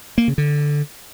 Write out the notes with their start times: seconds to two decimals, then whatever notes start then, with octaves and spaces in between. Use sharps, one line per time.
0.18 A#3
0.28 C#3
0.38 D3